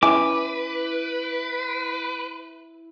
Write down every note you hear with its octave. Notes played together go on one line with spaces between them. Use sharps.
C#4 E4 B4 G#5 D6